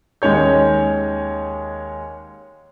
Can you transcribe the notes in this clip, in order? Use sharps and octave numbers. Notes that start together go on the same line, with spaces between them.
D#2 G#3 C#4 C#5 G6